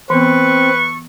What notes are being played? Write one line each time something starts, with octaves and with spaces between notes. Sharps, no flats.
E3 B3 C4 A4 B4 C#6